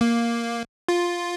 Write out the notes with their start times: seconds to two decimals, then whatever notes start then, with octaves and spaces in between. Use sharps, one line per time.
0.01 A#3
0.89 F4